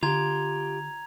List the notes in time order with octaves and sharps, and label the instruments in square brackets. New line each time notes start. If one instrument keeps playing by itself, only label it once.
[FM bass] D3 [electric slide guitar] F4 G4 [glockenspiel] A#5 G#6 F7